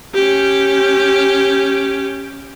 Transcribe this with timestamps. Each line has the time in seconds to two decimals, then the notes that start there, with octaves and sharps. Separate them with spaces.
0.14 C#4 G4